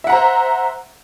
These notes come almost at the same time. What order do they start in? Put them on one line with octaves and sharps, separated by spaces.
E5 F#5 A#5 C5